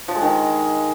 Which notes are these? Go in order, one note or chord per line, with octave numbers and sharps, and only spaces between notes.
F3
G#3
D#3